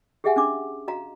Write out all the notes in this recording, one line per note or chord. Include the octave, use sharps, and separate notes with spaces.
G4 G#4 D#5 E5 F#5 G#5
C#4 D4 D6
F#4 D#5 F5 A#5